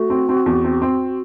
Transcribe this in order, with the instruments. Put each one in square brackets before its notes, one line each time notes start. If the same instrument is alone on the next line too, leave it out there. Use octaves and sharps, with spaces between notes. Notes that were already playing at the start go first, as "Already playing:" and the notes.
Already playing: [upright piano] A3 [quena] F#4
[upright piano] C4
C4
E2
C4
C4